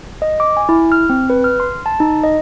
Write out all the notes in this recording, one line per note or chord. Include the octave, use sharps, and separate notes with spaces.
D#5
D6
G#5
E4
F6
C4
B4
F6
C6
A5
D#4
D#5